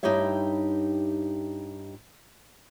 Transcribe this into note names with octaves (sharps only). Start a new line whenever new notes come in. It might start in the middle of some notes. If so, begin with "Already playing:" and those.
G2 D#4 E4 G4 C#5 E5